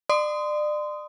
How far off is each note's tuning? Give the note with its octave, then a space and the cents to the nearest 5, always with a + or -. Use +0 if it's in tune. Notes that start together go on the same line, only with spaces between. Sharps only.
D5 +35 C6 -25 D#6 +0